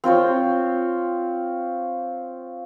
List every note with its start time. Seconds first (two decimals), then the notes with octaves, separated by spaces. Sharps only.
0.04 C4 F4 C5 C#5